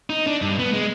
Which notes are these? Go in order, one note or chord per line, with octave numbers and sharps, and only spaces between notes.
D#4
D4
G2
B3
G#3